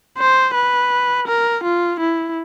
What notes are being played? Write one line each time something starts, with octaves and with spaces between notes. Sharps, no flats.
C5
B4
A#4
F4
E4